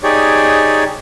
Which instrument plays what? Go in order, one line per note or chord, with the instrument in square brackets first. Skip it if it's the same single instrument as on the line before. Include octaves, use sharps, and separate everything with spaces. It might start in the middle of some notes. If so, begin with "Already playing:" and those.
[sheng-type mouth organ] D#4 G4 G#4 C#5 D5